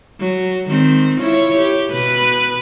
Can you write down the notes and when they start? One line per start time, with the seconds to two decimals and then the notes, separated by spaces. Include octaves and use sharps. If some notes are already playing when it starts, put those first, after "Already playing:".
0.20 F#3
0.68 D#3 G#3 C4
1.20 E4 F4 C#5
1.57 G4
1.90 B2 B4